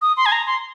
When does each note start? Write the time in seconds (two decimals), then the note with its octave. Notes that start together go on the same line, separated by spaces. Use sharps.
0.02 D#6
0.17 C6
0.26 G#5
0.32 A#5
0.46 C6